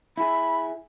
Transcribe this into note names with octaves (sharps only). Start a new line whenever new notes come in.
E4 G#4 B5